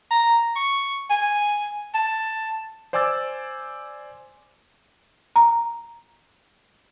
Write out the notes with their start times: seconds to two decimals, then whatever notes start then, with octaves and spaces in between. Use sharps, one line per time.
0.11 A#5
0.56 C#6
1.10 G#5
1.94 A5
2.93 C5 D5 G#5 D6 E6 A6
5.36 A#5